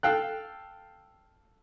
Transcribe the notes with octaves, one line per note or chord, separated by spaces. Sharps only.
A4 F5 G5 F#6